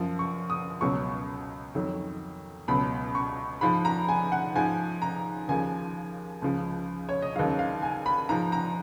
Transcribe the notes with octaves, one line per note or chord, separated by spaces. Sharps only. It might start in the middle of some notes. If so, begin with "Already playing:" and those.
Already playing: F#2 F3
C#6
D#6
C#2 B2 F#3 C#6
F2 D#3 F#3
C#2 B2 F#3 B5
C#6
G#2 F3 B5
A#5
G#5
F#5
G#2 F3 G#5
A#5
D#2 C#3 F3 G#5
C#2 C#3 F3
C#5
D#5
D#2 C#3 F#3 F5
F5
G#5
B5
G#2 F3 A#5
A#5